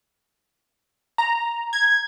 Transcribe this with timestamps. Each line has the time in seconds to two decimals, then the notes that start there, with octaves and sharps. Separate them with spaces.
1.18 A#5
1.73 G#6